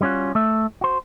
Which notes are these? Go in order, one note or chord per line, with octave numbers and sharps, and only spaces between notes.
G3 B3 C#4 F4 F#4
A3 E5
F#4 C5